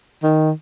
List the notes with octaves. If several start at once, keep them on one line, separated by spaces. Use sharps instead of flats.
D#3